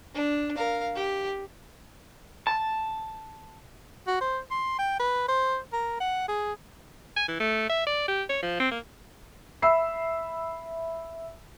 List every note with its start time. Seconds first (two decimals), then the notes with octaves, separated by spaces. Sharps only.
0.14 D4
0.56 A#4 F5
0.95 G4
2.47 A5
4.07 F#4
4.21 C5
4.51 C6
4.79 G5
4.99 B4
5.28 C5
5.73 A#4
6.00 F#5
6.28 G#4
7.17 G#5
7.28 E3
7.40 A3
7.69 E5
7.87 D5
8.08 G4
8.29 C#5
8.43 F3
8.60 C4
8.71 A#3
9.62 E5 B5 E6 C7